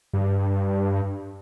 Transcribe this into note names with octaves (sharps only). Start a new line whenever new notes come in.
G2